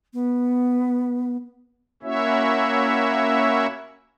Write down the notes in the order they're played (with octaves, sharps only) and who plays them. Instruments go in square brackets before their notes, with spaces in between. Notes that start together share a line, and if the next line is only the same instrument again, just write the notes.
[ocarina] B3
[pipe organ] A#3 C#4 E4 F#4 C#5 E5